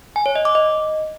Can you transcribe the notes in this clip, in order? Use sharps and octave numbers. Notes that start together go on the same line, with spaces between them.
G#5
C#5
D#5
D6
D#5